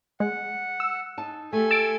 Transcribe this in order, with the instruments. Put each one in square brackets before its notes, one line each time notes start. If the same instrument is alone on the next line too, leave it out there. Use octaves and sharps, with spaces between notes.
[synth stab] G#3 [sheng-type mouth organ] F#5
[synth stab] E6
[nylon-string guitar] D#4 A5
[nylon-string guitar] A3 G4 [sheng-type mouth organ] A4 G#5
[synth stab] E6 A6 D7